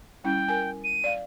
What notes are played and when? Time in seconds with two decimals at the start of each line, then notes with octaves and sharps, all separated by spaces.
0.24 G3 C#4 E4 G5
0.48 A#4 G#5
0.84 D#7
1.04 D5 F5